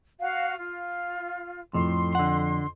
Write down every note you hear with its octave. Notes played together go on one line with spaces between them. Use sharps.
F#4 F5
F4
F2 A2 C6
D3 F#5